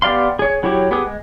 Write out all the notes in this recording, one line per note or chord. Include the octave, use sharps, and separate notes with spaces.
B3 G4 D5 F5 C6
G#4 C#5
F#3 E4 F#4 G4 C#5
B3 G4 G#4 B4 D#6
G#3